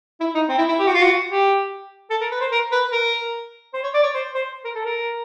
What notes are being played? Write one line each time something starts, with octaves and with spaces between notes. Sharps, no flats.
E4
D#4
C4
E4
E4
G4
F#4
F4
F#4
G4
A4
A#4
B4
C5
A#4
B4
A#4
C5
C#5
D5
C#5
C5
C5
A#4
A4
A#4